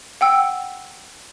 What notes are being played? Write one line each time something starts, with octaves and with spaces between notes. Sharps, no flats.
F#5 G5 E6